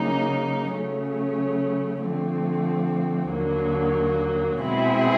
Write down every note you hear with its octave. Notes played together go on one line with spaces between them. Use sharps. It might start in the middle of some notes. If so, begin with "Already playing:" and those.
Already playing: C#3 F#3 A#3 D#4
C#3 F#3 A3 C#4
D3 F3 A3 C4
D#2 D3 F#3 A#3
B2 G#3 C4 E4 G#4